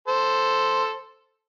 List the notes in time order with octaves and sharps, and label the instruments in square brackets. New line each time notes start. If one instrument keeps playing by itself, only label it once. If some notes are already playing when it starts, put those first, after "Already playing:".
[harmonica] A4 C5